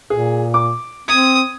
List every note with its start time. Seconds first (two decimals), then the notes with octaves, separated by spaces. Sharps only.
0.10 A#2 G#4
0.54 D6
1.08 C4 D#6 G#6